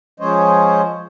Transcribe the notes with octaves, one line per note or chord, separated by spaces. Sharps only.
F3 G#3 C#4 C5 C#5 D#5